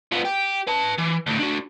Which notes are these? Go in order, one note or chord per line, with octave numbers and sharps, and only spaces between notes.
F3 B3
G4
B4 A5
E3
D2 A2
D4 F#4